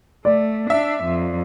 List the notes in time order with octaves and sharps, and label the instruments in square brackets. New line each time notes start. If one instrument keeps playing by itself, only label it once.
[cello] A3 [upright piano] D5
[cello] D4 [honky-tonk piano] E5
[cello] F2